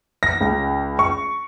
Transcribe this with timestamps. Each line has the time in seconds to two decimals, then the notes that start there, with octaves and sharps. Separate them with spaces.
0.23 A#6
0.41 C#2
0.99 C#6